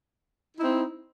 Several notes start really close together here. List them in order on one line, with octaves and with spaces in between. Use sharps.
D#4 E4 C4